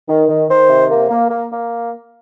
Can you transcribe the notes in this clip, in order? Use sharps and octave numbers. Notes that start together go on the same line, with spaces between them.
D#3
D#3
D#3 C5
C3
A#3
A#3
A#3
A#3